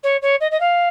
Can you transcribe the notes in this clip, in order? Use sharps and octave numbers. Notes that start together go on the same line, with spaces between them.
C#5
C#5
D#5
D#5
F5